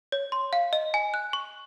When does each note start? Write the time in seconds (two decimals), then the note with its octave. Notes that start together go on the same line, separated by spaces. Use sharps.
0.12 C#5
0.32 C6
0.53 F5
0.73 D#5
0.94 G#5
1.14 F#6
1.33 C#6